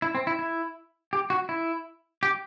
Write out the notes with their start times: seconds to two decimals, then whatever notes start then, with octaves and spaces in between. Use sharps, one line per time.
0.02 E4
0.15 C4
0.27 E4
0.39 E4
1.13 G4
1.30 F#4
1.49 E4
2.23 G4